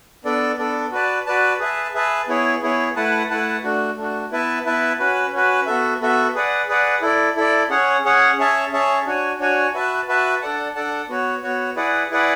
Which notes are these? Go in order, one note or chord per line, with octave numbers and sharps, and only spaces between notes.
B3 D4 A4 D5
B3 D4 A4 D5
F#4 B4 D5 A5
F#4 B4 D5 A5
G#4 B4 E5 A5
G#4 B4 E5 A5
B3 E4 G#4 C#5
B3 E4 G#4 C#5
A3 E4 B4 F#5 A5
A3 E4 B4 F#5 A5
A3 D4 F#4
A3 D4 F#4
B3 E4 B4 E5 A5
B3 E4 B4 E5 A5
C#4 F#4 B4
C#4 F#4 B4
B3 F#4 A4 E5
B3 F#4 A4 E5
G#4 B4 D5 F#5
G#4 B4 D5 F#5
E4 A4 D5
E4 A4 D5
C#4 G#4 C#5 F#5
C#4 G#4 C#5 F#5
C#4 G#4 C#5 E5 A5
C#4 G#4 C#5 E5 A5
D4 F#4 C#5 G#5
D4 F#4 C#5 G#5
F#4 B4 E5 A5
F#4 B4 E5 A5
D4 A4 D5 F#5 A5
D4 A4 D5 F#5 A5
B3 F#4 C#5
B3 F#4 C#5
E4 G#4 B4 D5 F#5
E4 G#4 B4 D5 F#5